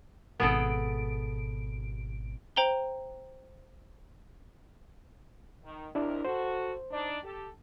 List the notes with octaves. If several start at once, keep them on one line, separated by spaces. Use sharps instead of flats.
G#1 B2 B3 G#4 A4 D7
C5 G5 A#5 F#7 G7
D#3
D#2 C3 D4 E4 A#4
F#4 A4 C5
D4 D#4 D5
G4 A4